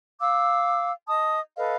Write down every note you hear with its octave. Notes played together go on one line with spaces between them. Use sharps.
F5 D6 E6
D#5 A5 D#6
A4 B4 D#5 F5